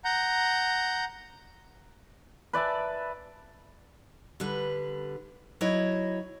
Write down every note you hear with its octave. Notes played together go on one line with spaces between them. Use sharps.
F#5 A#5 G6
B4 D5 E5 A5
D3 G3 B4
F#3 E4 C#5 D#5